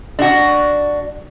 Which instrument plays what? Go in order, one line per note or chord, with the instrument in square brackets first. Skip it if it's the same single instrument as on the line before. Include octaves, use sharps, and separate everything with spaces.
[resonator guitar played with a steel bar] D4 F#4